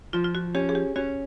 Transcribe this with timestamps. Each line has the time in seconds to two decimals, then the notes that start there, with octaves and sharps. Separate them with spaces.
0.13 F3 F4
0.24 F4
0.35 F#4
0.55 C#4 G4
0.69 G#4
0.75 G4
0.96 C#4 F#4